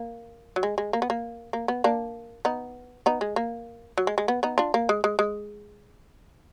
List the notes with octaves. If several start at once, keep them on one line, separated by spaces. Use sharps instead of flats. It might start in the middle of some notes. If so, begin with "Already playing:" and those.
Already playing: A#3
F#3
G#3
G#3
A#3
B3
A#3
A#3
B3
A#3 D4
B3 D#4
B3 D#4
G#3
A#3
F#3
G#3
G#3
B3
B3 D#4
D4 F4
A#3
G#3
G#3
G#3